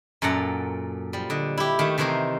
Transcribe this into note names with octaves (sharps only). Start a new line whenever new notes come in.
F#2 A#2 A4 F#5 A#5
F3 G3
D3 D#5
E4 G4
D#3 A3 A5
C3 D#3 E3 D#4 C5 A#5